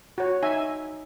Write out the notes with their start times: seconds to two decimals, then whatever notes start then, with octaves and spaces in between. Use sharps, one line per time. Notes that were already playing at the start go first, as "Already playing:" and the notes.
0.18 F#4 C#5
0.43 D#4 E5 G#5